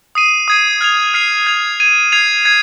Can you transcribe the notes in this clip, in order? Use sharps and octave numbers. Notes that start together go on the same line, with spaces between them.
D#6 C7 D#7
D#6 G#6 C7 D#7
F6 G#6 F7
F6 C7 F7
G#6 F7
G#6 D#7
G#6 C7 F7
G#6 C7